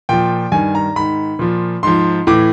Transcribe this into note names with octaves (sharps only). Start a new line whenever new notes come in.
A#2 F3 G5
G2 D#3 G#5
A#5
G#2 D#3 B5
A#2 F3
G#2 F3 C6
A2 E3 D6